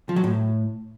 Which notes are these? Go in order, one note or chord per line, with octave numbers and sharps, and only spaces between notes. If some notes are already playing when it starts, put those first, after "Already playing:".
F3
F#3
A2